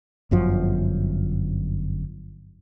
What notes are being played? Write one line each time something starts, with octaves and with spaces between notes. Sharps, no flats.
G1 F#2 F3